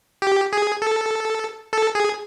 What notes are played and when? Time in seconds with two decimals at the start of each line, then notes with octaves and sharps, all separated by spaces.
0.22 G4
0.53 G#4
0.82 A4
1.73 A4
1.95 G#4